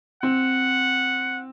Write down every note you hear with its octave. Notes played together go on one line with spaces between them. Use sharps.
C4 F#5